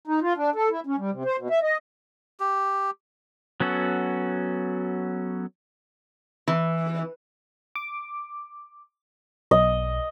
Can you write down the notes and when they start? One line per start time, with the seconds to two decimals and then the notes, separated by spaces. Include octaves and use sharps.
0.07 D#4
0.22 F4
0.37 D4
0.55 A4
0.71 E4
0.87 C#4
0.98 G3
1.11 C3
1.25 C5
1.38 B2
1.50 E5
1.63 D#5
2.40 G4
3.60 F#3 B3 C#4 F#4 A4
6.48 E3
7.75 D6
9.51 B1 D#5